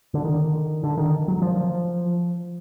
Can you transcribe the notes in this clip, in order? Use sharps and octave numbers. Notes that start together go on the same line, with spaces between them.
D3
D#3
D3
D#3
F#3
F3